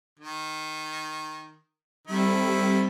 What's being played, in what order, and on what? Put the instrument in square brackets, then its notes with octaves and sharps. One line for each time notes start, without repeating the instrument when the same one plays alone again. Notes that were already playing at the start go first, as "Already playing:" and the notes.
[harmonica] D#3
[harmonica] D#3 E4 [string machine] G3 C4 A4